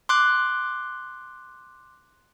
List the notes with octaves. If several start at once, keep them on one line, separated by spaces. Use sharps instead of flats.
C6 D6 F#6